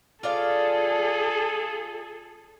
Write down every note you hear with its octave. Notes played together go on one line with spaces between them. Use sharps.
F4 G#4 A4 D5 F5